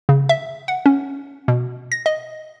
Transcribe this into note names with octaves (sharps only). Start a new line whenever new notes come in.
C#3
E5
F#5
C#4
B2
A#6
D#5